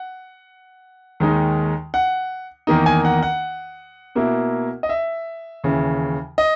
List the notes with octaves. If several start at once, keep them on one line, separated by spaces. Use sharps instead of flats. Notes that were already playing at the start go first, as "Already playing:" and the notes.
Already playing: F#5
D#2 D#3 G#3 D#4
F#5
E2 D#3 A#3 D#4
G#5
F#5
F#5
B2 A#3 E4
D#5
E5
D#2 C#3 E3
D#5